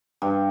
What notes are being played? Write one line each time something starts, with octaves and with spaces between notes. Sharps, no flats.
G2